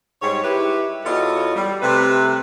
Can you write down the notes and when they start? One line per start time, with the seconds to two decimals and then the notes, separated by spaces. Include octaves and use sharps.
0.22 G#2 G3 G#3 C#5
0.43 E4 G4 B4
1.05 E2 F4 F#4 A4 C#5 D#5
1.55 G3
1.81 C3 A3 B4